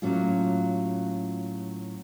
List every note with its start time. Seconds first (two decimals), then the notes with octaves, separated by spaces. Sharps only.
0.02 A2 F#3 A#3 C#4 F4